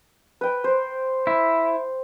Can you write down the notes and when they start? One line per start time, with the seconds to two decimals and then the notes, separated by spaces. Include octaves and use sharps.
0.41 B4 G5
0.64 C5
1.27 E4